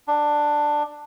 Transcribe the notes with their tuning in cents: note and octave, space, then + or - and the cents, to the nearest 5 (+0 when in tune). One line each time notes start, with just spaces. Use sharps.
D4 +10